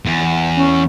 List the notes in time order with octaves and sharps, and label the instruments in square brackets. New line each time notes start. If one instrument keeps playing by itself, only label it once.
[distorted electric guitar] E2
[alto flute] C#4